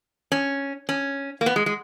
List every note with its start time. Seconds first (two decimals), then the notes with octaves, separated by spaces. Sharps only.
0.32 C#4
0.89 C#4
1.41 A#3
1.46 B3
1.56 G#3
1.66 G#3